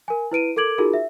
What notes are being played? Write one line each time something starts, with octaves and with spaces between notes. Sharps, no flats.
A#4 G#5
E4 B4 D7 D#7
A4 A#4 D6 G#6 D7 F#7
D#4 F4 F#4 G#4 A#4
E5